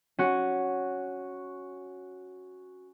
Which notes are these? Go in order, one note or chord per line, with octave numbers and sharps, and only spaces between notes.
C#4 F#4